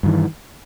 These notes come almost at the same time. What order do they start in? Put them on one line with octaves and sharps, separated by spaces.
G2 D#3 E3